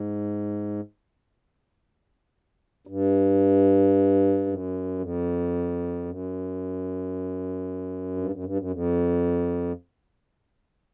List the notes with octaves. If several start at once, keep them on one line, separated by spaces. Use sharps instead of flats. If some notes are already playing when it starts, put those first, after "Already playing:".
Already playing: G#2
G2
F#2
F2
F#2
G2
F#2
G2
F#2
F2